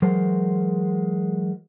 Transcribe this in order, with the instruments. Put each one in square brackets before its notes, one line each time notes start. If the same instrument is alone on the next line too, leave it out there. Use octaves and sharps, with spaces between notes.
[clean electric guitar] E3 F#3 G#3 A#4 C5